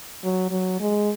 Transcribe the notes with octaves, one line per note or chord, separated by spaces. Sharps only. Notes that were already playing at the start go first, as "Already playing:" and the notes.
F#3
F#3
G#3